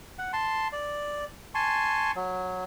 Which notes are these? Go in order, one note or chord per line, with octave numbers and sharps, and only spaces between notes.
F#5
A5 C6
D5
G#5 A5 C6 C#6
F#3